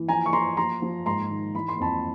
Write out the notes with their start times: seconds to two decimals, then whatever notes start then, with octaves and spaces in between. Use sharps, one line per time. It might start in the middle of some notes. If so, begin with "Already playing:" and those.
Already playing: E3
0.08 F3 G#5 A#5
0.26 C#6
0.32 F3 A#5 C6
0.57 F3 A#5 C6
0.82 F3
1.06 G#2 A#5 C6
1.30 D#3
1.55 E3 B5
1.68 C6
1.79 F2 A5 B5